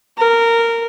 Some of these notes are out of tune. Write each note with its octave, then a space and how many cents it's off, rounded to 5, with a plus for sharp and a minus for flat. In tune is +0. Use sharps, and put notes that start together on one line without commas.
A#4 -15